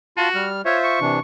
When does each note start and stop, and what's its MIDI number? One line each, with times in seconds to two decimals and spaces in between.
0.17 0.29 65
0.17 0.46 66
0.17 0.29 81
0.17 0.29 84
0.35 0.62 55
0.35 0.62 89
0.65 1.00 65
0.65 1.00 72
0.65 0.76 73
0.65 1.00 76
0.84 1.21 85
1.01 1.19 48
1.01 1.19 52
1.01 1.19 62